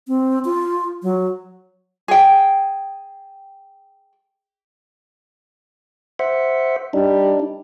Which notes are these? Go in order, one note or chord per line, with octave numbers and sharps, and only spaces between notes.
C4
F4
F#3
G#4 G5
C5 E5 F#5
G3 D4 D#4